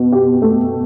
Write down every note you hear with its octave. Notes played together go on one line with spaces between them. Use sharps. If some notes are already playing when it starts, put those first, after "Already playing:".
Already playing: B2
G4
A3